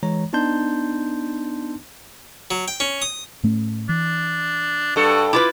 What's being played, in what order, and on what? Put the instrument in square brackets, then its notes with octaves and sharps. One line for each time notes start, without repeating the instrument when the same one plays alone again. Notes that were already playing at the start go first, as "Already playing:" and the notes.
[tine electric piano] E3 G#3 C#5 A#5
B3 D4 D#4 A5 C6 G6
[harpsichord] F#3
G5
C#4
D#6
[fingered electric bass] A2 A3 C#4
[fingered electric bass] E3 [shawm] D4
[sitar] G2 A4 [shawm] F#4
[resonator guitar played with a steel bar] E4 F4 B4 [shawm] D6